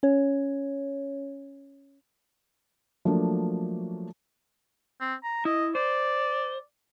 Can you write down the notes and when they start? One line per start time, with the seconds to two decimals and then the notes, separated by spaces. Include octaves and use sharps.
0.03 C#4 C#5
3.05 F3 F#3 A3 A#3 D4
5.01 C4
5.24 A#5
5.45 E4 D#5
5.75 C5 D5